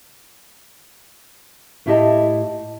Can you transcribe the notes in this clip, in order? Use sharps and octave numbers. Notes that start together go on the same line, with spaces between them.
A2 A3 E4 G4 D#5 A5